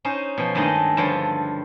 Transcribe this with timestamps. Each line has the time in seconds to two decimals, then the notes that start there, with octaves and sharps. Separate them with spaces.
0.05 C#4 D#4 C5
0.37 B2 F3
0.55 G2 D#3 G#3 A3 D#4 D#5
0.97 G2 D3 F3 F4 C#5 G5